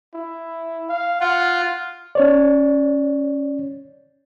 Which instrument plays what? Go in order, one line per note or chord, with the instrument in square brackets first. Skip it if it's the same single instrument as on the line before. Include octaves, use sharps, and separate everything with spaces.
[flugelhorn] E4
F5
[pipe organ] F4 [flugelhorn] F#5
[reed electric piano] C#4 C#5 D5